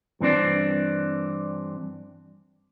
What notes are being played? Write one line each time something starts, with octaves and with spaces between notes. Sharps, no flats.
G2 E3 C4 D4